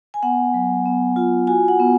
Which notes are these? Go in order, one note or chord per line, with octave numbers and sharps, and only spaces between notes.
G#5
B3 F#5
F#3
B3
F4
F#4 G#5
F#5
B3